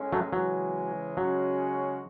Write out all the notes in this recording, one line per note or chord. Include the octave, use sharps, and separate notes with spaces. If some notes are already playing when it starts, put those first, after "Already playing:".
Already playing: A2 G#3 C#4
F#3 A3
C#3 E3 F#3 G#3
C#3 F#3 G#3 C#4 F#4